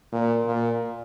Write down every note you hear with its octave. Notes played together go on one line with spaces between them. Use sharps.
A#2
A#2